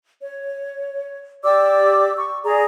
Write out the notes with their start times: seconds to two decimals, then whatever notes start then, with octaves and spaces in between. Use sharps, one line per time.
0.21 C#5
1.43 G4 D5 D6 E6
2.17 C#6
2.44 G#4 D5 A#5